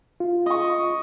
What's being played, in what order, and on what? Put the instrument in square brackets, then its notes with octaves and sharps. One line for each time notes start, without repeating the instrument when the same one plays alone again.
[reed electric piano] F4
[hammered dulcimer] D#5 C#6